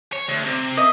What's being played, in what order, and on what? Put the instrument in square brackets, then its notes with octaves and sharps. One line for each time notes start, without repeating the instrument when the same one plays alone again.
[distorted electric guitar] C#5
D2
C3
[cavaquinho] D#5 E5